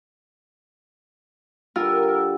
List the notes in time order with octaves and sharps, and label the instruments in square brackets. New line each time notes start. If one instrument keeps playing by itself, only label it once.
[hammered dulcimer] D3 G3 [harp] F4 [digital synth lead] A#4 [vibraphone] E6